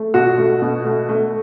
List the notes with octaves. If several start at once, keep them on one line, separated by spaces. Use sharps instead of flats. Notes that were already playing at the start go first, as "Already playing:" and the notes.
Already playing: A3
B2 F#4
A3
B2
A3
A3